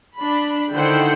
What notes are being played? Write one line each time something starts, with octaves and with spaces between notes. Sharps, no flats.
D4 B5
D3 D#3 E4 C5 F#5 G5